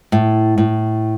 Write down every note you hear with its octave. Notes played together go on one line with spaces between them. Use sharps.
A2
A2